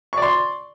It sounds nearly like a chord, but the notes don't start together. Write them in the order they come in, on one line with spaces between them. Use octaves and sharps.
C#6 D5 C6